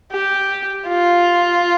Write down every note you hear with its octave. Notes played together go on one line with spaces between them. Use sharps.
G4
F4